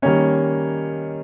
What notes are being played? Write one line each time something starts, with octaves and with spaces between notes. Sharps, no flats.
D#3 G3 A#3 C#4 C#5